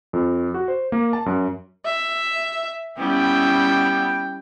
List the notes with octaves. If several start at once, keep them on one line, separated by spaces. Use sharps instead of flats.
F2
F#4
C5
A#3
A5
F#2
E5
G3 B3 C#4 E4 G5